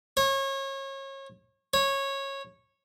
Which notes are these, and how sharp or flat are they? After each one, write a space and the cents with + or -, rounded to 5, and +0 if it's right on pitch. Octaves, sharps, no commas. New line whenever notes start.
C#5 -30
C#5 -15